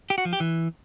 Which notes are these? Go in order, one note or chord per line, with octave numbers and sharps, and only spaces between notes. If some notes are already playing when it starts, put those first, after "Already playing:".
G4
F#4
F3
G4
E3